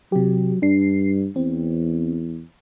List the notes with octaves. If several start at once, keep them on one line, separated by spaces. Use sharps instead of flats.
C3 F#3 G4
G2 D4 C7
E2 C4